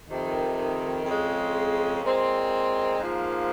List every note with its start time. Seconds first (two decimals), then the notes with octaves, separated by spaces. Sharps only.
0.08 F2 C3 D#3
1.05 F2 C#3 G#3
2.03 A#2 G#3 C4
2.99 G#2 F3 A#3